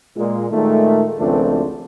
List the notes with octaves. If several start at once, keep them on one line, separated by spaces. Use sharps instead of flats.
A#2 G#3
A#2 D#3 G#3 A3
G#1 C#2 F3 A3 C4 D4